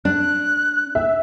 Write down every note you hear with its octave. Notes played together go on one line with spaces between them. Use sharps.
D4 F#6
E5